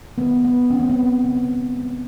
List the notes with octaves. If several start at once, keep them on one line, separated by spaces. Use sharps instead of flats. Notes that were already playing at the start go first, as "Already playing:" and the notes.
D#3 B3
D#3 B3
D#3 C#4
C4
B3
F#3 C4
C#3
G#3
G#3